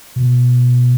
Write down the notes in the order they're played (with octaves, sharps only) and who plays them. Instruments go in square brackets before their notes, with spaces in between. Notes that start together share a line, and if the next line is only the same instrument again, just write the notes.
[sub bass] B2